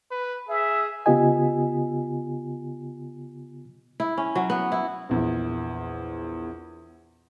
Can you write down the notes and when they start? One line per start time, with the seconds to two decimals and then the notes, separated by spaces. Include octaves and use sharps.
0.11 B4
0.49 G#4 E5
1.06 C#3 B3 F4 G4 D#5 G#5
4.00 E4
4.17 C#4
4.35 F#3
4.50 B3
4.72 E4
5.09 A#1 E2